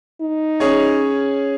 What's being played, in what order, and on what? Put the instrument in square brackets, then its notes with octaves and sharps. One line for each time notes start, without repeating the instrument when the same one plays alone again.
[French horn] D#4
[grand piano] C#4 G#4 C#5